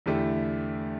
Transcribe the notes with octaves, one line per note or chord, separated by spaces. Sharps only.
E2 D3 A3 E4 G4